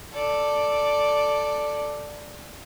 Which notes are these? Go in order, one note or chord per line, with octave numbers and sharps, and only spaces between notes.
A4 D5